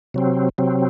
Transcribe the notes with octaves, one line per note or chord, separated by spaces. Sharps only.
C3 F#3 C4
C3 F#3 C4